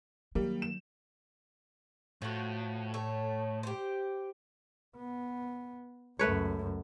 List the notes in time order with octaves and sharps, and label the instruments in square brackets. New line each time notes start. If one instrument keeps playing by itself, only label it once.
[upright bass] D#3 [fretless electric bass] F#3 [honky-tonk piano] G3 [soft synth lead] A#3
[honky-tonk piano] E7
[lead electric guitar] A2 [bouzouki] F3 F#4
[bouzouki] A3 C#5
G4 C5
[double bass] B3
[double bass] C#2 F#2 [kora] A3 B4 C#5